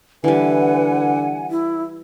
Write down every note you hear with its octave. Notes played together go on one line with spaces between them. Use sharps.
D3 E3 G3 B4 F#5 G#5
E4